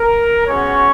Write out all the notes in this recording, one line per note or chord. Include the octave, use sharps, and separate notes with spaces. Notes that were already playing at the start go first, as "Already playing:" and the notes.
Already playing: A#4
G#3 B3 C#4 F#4 C#5